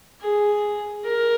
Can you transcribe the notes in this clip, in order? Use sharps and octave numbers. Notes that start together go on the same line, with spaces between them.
G#4
A#4